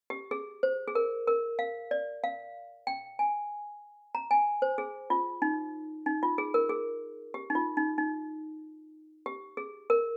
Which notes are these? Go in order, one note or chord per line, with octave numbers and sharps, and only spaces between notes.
G4
G#4
C5
G#4
A#4
A#4
F5
D5
F5
G5
G#5
A#5
G#5
C5
G#4
F4
D#4
D#4
F4
G#4
A#4
G#4
G4
D#4
F4
D#4
D#4
G4
G#4
A#4